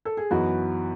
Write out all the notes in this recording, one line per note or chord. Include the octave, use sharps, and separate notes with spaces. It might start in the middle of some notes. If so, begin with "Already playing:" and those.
A4
G#4
F#2 E3 B3 D#4 F#4